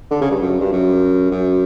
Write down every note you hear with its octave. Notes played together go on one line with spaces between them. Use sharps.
D3
C#3
G2
F#2
G2
F#2
F#2